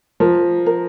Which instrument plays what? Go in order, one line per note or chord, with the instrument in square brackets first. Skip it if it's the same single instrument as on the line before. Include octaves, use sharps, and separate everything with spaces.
[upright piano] F3 [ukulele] A#4
[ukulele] A#4